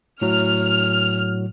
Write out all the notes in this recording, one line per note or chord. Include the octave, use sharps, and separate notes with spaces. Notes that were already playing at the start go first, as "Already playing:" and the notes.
A2 F#3 F6